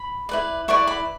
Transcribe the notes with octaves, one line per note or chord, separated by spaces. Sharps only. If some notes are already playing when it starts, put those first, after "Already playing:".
Already playing: B5
E4 B4 D5
E4 B4 D5 C#6
B5